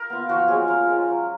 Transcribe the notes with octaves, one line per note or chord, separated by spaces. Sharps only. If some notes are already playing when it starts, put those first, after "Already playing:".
Already playing: A#4
B3 F4
F3 F#4
G#3 C#4 F4 G#4
F3 A#4
G#3 C#4 F4
F#3